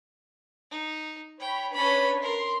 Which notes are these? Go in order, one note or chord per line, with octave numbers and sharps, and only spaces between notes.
D#4
C#5 G5 B5
C#4 D4 B4 C#5 B5
A#4 C6